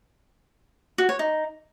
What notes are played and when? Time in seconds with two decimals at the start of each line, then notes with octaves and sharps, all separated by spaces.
0.98 F#4
1.09 C#5
1.19 D#4